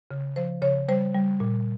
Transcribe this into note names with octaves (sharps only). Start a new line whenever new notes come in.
C#3
F3 C5
C#3 C#5
G3 C5
G3
A#2